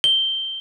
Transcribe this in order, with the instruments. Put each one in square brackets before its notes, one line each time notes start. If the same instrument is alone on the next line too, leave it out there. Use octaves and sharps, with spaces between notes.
[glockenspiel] G7